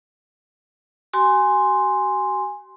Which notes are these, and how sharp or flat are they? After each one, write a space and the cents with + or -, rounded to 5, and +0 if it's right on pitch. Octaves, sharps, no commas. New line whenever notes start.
F#4 +40 G#5 -5 C6 +0